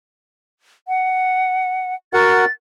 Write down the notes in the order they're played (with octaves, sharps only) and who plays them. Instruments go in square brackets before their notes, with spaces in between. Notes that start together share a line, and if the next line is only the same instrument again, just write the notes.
[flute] F#5
[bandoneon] F#4 A#4 F#5 [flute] A6